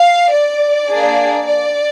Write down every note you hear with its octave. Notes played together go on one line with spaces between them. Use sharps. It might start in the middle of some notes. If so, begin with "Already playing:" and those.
Already playing: F5
D5
A#3 D4 G#4
D5